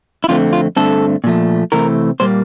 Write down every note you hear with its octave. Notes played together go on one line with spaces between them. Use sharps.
E4
F2 D3 A3 C4 F4
F4
G2 D3 A3 C4 A4
A#2 F3 A3
C3 E3 A3 C4 A#4
A#2 G3 A#3 C5